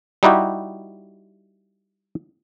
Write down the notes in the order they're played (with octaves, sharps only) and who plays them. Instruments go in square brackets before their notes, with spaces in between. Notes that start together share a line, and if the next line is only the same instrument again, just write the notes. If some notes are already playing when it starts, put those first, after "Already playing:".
[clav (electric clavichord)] G3 D#4 E4 F#4 G4